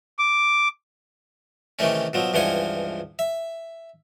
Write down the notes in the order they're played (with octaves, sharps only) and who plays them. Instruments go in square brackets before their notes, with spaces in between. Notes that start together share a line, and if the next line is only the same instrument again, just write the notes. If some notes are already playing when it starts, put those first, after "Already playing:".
[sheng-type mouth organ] D6
[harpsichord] C3 D#3 E3 A3 C#4
B2 F3 F#3
C#2 G2 E3 F3 F#5 G#5
E5